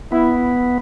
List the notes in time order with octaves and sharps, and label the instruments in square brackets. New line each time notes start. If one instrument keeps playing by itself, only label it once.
[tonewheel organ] B3 [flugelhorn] E4